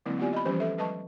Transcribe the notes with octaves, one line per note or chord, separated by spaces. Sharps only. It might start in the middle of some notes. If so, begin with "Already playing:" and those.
D3 F#3 G#3 A#3 C4 E4
B3 E4 F4 G4 D5 G#5
D#5 B5
E3 F3 G3 C#4 G4 C5
A4 B4 E5
F#3 G#3 B4 D#5 A5 C#6